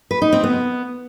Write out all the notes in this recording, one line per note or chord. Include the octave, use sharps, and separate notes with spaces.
B4
D#4
C4
B3